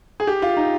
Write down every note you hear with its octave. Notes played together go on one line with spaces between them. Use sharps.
G#4
G4
F4
D#4